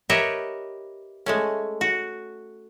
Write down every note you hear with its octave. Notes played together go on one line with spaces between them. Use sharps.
G4 A#4 B4 C#5 D#5 E5
G#3 A3 C#4
F#4